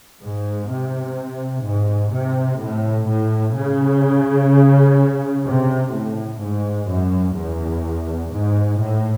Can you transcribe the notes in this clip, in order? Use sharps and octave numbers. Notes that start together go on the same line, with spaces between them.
G#2
C3
G#2
C3
A2
A2
C#3
C3
A2
G#2
F#2
E2
G#2
A2